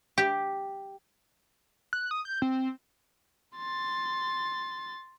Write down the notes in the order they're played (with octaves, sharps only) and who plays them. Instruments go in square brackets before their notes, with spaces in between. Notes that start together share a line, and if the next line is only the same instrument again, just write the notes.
[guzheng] G4
[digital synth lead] F#6
D#6
G6
C4
[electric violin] C6 A6